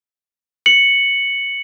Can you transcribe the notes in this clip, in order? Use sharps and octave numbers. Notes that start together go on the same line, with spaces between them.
C#7 F#7